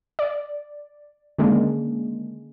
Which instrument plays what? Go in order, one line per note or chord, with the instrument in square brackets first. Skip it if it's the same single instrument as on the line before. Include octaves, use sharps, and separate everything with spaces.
[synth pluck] D5
D3 D#3 G#3 A#3 C#4 D4